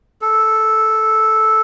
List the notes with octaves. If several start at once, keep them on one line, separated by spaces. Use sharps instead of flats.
A4